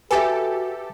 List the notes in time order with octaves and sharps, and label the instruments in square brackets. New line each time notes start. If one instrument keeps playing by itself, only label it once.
[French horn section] F#4 [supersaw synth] G4 A4 [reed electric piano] B4 E5 [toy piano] G#5